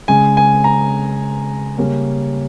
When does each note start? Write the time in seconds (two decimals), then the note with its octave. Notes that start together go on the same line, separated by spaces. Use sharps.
0.08 C#3 G#3 C#4 G#5
0.37 G#5
0.64 A#5
1.78 C#3 G3 A#3 C#4